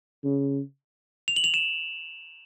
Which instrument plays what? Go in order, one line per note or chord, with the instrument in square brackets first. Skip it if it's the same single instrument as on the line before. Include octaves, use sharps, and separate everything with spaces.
[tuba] C#3
[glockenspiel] F7
F#7
F7
E7